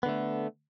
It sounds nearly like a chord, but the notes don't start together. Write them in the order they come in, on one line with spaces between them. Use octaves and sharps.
B3 D3 A3